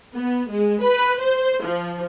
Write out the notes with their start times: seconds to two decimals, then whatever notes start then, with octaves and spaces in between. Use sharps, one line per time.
0.14 B3
0.51 G#3
0.82 B4
1.20 C5
1.63 F3